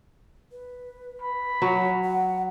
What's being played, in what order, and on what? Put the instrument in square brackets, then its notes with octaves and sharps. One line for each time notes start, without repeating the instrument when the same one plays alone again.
[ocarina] B4
[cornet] B5
[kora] F#3 [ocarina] C#5
[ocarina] F#5